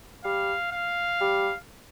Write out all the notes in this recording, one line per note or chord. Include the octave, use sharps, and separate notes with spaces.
G3 F5
F5
G3